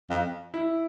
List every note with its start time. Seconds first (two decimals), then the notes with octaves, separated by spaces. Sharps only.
0.10 F2
0.54 E4